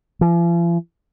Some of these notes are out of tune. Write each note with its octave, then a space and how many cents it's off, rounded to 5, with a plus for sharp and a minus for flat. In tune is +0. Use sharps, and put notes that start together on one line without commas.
F3 -45